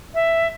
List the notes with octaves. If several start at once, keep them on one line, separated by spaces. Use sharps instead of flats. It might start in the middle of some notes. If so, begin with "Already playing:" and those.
E5